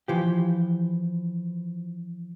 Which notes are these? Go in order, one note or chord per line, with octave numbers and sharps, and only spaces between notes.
E3 F3 G4